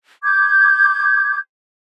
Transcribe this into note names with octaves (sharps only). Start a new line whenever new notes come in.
D6 G6 G#6